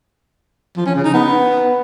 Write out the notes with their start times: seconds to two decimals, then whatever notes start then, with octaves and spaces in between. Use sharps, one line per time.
0.77 F3
0.86 C#4
0.95 C#3
1.05 D#4
1.14 B3